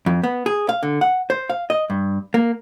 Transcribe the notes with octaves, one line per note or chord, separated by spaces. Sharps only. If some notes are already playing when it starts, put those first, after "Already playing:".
F2
B3
G#4
F5
D3
F#5
C5
F5
D#5
G2
A#3